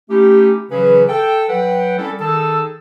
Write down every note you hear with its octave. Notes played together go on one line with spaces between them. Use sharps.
A3 C#4 D#4 E4 G4
C#3 E3 F#3 C#4 G#4 B4
A4 G5
F#3 B4 F#5 G5
G3 C4 C#4 E4 A4
D#3 D#4 G#4 A4 A5 E6